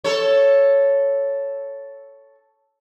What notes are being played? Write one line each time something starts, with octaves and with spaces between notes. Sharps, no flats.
A4 C#5